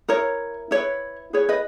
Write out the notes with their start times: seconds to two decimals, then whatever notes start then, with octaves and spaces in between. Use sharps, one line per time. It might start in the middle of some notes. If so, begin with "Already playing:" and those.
0.08 E4 A#4 C#5
0.71 E4 B4 C#5
1.33 E4 G#4 B4 C#5
1.49 B4 D#5